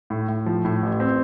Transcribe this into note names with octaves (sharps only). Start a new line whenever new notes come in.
A2
A2
F3
A2
A1
C4